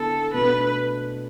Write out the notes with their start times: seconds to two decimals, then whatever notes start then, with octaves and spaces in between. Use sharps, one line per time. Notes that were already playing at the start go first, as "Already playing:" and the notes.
Already playing: D3 B3 E4 A4
0.34 B2 A3 D4 B4